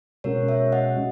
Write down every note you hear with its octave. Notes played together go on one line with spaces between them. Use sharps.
B2 G#3 C#4 F#4 A#4 C#5
C#5 E5
D#5 F#5